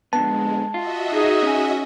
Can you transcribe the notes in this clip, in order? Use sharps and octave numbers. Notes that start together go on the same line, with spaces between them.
F2 D3 G#3 B3 A5
F4 F#4 D#5 E5
D#4 G#4
C#4 G#5